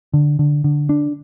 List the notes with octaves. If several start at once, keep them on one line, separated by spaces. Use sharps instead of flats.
D3
D3
D3
D4